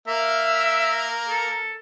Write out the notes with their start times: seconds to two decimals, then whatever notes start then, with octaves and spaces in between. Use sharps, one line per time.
0.08 A#3 A#4 E5
1.29 A4